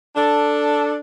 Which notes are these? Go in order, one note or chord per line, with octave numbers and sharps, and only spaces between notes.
D4 A4